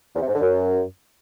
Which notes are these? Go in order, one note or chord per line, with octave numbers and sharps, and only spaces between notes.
E2
C3
G#2
D3
F#2